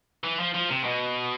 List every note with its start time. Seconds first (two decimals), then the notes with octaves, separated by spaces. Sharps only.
0.24 E3
0.39 F3
0.54 F3
0.70 C3
0.84 B2